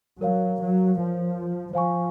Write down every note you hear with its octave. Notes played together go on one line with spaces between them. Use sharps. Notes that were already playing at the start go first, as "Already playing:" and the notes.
F#3 A#4 C#5 F5
F#3
F3
F3 C5 F5 G#5 C#6